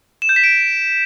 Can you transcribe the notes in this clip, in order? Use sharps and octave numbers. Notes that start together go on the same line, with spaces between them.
E7
G6
B6
D7